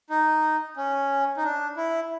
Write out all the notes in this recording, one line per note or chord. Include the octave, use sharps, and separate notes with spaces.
D#4
C#4
D#4
D4
E4